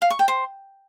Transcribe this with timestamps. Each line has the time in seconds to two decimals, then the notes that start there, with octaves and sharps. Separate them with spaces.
0.02 F5
0.10 C#6
0.19 G5
0.28 C5